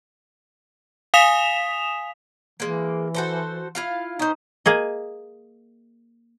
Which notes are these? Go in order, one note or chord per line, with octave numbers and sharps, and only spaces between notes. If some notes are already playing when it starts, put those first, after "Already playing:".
F5 G#5 D#6 B6 E7 F7
E3 G#3 A#3
F#4 A4 C5
E4 F4 F5
C#4 D#4 C5
A#3 G#4 D#5